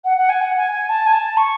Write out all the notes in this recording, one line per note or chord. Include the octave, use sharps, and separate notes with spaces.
F#5
F#5
G#5
F#5
G#5
G#5
A5
G#5
A5
C#6